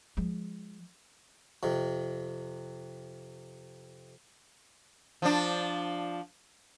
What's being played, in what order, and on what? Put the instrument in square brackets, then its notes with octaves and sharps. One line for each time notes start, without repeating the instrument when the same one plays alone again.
[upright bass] F3 G#3
[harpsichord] F2 C3
[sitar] F3 D4